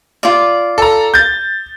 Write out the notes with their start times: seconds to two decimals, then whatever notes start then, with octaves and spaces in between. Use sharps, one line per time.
0.23 F4 D5
0.78 A4 A#5
1.14 G6 A6